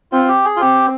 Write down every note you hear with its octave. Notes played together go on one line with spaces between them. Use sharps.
C4 F4
G4
G#4
F4
C4 G4